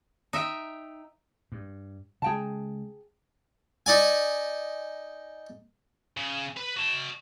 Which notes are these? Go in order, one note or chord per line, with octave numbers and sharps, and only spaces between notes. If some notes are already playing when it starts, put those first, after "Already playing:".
D#4 E5 G5
G2
C#3 G#3 G#4 G5 A5
D#4 D5 G#5
C#3
B4
F#4 A5